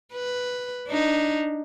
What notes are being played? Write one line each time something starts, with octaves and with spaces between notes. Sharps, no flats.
B4
D4 D#4